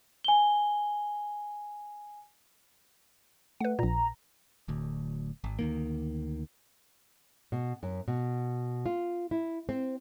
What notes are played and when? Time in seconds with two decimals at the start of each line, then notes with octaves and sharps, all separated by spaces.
0.24 G#5 G7
3.60 A3 B4 F#5
3.79 A#1 A#2 A#5
4.68 D1 D2
5.44 G#1
5.59 D2 D#3 A#3
7.52 B2
7.83 F#2
8.08 B2
8.86 F4
9.31 E4
9.69 C4